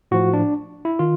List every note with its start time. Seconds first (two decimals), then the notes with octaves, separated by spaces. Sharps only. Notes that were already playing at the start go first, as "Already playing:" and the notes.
0.11 A2 F3 F#4
0.33 D4
0.85 E4
0.99 D#3 F4